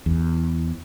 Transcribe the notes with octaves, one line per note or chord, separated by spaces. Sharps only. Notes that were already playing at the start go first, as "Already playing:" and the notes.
E2